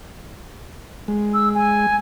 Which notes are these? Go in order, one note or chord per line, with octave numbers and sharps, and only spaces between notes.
G#3
E6
G#5